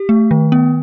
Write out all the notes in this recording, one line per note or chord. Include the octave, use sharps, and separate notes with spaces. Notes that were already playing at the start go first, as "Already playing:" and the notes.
Already playing: G4
A3
D#3
B3